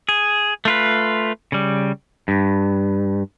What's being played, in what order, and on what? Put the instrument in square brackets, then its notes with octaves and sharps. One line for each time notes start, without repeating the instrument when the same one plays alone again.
[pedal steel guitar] G#4
A3 F4 B4
C#3 G3
[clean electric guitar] G2